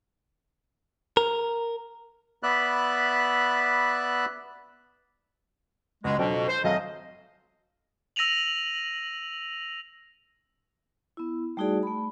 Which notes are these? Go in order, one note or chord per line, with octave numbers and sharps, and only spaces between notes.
A#4
B3 D5 E5 B5 F#6
C#2 B2 G#3
F2 B2 F#3 D4 G5
C5
G#1 F#3 A3 D#5 F5
E6 A#6 D#7 F7 F#7
B3 E4
G3 A3 D#4 F#4 G#4 D5
A3 B5